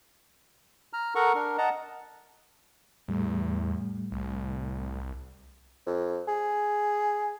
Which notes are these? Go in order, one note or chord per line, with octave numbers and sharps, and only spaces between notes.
A#5 F6
A4 A#4 F#5 A#5 C#6
D4 A#4
D#5 F#5 A5 A#5
E2 A2 G3 A3
C2
F2
G#4